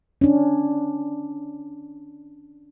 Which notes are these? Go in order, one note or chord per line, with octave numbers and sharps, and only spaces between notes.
C#4 D4